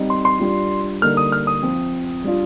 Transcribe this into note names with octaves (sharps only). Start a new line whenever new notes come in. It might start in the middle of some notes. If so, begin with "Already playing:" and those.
Already playing: G3 C4 D#4
C6
C6
G3 D4 F4
D3 G3 A#3 D#4 F6
D#6
F6
D#6
F3 C4 F4
G3 D4 F4